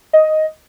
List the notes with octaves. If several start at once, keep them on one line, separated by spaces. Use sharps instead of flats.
D#5